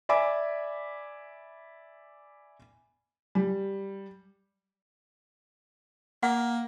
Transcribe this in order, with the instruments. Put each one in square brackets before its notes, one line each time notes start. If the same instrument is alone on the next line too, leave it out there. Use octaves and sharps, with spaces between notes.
[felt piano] D5 E5 G#5 B5 D6
G3
[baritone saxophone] A#3 [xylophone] F#5